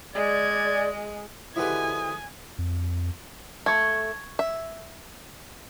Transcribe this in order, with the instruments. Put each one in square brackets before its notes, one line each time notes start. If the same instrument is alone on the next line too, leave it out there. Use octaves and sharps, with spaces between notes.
[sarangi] G#3 [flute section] D5 [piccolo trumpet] G#6
[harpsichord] G#2 D3 G4 [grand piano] E4 F#4 B4 [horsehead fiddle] G#5 [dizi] D#6
[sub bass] F2
[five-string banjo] A3 [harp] C#6 G#6
[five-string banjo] E5